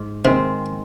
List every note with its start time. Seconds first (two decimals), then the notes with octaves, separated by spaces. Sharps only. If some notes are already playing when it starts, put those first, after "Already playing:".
Already playing: G#2
0.24 C3 D#3 G#3 C4